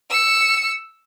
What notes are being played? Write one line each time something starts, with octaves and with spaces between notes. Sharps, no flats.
E6 C#7